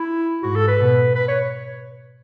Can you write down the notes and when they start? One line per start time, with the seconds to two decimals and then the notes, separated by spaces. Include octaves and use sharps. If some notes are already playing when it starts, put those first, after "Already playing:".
Already playing: E4
0.43 G#2 F#4
0.56 A4
0.68 B4
0.80 B2
1.15 B4
1.28 C#5